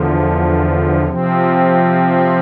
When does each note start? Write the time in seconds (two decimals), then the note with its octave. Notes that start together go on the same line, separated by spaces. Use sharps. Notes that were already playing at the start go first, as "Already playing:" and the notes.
Already playing: E2 D3 F3
1.04 C3 F3 C4